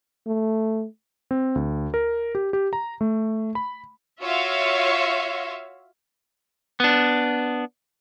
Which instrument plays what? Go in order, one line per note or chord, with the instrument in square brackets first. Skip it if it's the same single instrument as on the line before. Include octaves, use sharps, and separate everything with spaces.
[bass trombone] A3
[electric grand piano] C4
D2
A#4
G4
G4
A#5
A3
B5
[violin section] F4 F#4 C#5 E5 F5
[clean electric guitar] B3 D4